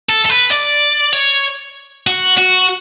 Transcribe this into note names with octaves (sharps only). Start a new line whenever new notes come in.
A4
A4
B4
D5
C#5
F#4
F#4